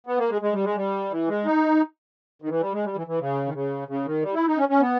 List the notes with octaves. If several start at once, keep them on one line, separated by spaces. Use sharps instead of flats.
B3
A#3
G#3
G#3
G3
G#3
G3
E3
G#3
D#4
D#3
E3
G3
G#3
G3
E3
E3
C#3
D#3
C#3
C#3
D#3
G3
E4
D#4
C#4
C#4
B3